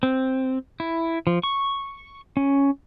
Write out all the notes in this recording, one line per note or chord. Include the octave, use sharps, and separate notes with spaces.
C4
E4
F3
C#6
C#4